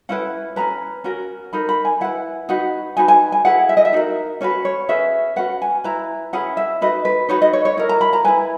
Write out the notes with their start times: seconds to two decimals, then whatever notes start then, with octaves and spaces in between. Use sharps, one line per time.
0.09 C#4 E4 B4 F#5
0.56 C#4 G#4 B4 A#5
1.04 C#4 F#4 A#4
1.53 D#4 A#4 B5
1.69 B5
1.85 G#5
2.01 E4 B4 F#5
2.49 D#4 F#4 B4 F#5
2.97 D#4 F#4 B4 G#5
3.08 G#5
3.32 G#5
3.45 E4 G#4 B4 F#5
3.69 E5
3.77 D#5
3.85 E5
3.93 D#4 F#4 A#4
4.41 C#4 F#4 B4 C#5
4.65 C#5
4.89 C#4 G#4 B4 E5
5.36 C#4 F#4 B4 F#5
5.62 G#5
5.84 E4 B4 A#5
6.33 C#4 E4 G#4 B4 F#5
6.57 E5
6.81 D#4 F#4 B4 D#5
7.05 B4
7.29 D#4 F#4 B4 C#5
7.42 D#5
7.53 C#5
7.65 C#5
7.77 E4 A#4 D#5
7.89 A#5
8.01 B5
8.13 A#5
8.25 E4 B4 G#5